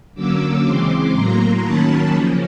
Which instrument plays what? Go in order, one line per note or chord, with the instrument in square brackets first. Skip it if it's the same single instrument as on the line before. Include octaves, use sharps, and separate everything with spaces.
[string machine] D3 F#3 A#3 C#4 D6 E6
C#3 E3 G#3 C4 C6 D6
A2 F#3 A#3 A#5 C6
D#3 F#3 A#3 C#4 A5 B5
C#3 F3 A#3 C#4